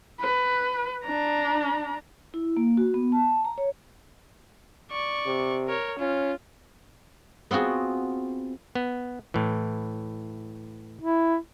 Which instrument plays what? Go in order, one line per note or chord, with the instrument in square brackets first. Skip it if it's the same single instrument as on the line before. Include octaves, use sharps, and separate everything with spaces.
[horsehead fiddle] B4
D4 A#5
[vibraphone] E4
A#3
F#4
B3
A5
A#5
C#5
[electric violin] D5 C#6
[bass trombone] C3
[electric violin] A#4 C#5
[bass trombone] C#4 [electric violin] F4
[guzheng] B3 C4 F4 F#4 G#4
[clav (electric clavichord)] B3
A2 E3
[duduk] E4